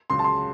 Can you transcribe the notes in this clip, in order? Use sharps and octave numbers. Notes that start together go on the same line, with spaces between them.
C#2 C#3 F#3 C6
A5
C6